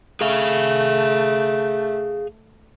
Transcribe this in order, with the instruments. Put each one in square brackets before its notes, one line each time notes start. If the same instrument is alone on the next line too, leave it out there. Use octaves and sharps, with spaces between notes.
[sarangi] A3 [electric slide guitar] G#4 F5